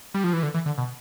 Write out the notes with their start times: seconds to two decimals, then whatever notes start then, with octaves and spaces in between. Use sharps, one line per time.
0.14 G3
0.24 F3
0.33 E3
0.43 D3
0.54 E3
0.66 D3
0.78 B2